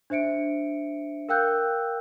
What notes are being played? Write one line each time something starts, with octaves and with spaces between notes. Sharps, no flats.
D4 C5 E5 C#7 D7
A#4 F5 G5 E6 F#6 G6